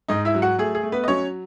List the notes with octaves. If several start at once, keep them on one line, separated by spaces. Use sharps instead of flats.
G#2 D#4 D#5
E4 E5
F#3
F#4 F#5
A3 G#4
G#4
A3
B3 B4
D#5
F#3 C#4 C#5